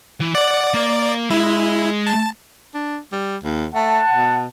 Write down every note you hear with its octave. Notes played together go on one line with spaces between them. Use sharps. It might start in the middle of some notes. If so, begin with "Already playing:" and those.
E3
D5 F#5
A#3
G#3 E4
A5
D4
G3
D#2
A3 F#5 A5
B2